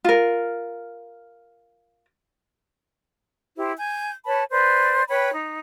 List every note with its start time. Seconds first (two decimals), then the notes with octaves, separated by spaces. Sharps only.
0.04 F4 A#4
3.56 E4 G4 C5
3.78 G#5 G6
4.25 B4 C#5 A5 B5
4.50 B4 C5 D5
5.09 B4 C#5 G5 B5
5.33 D#4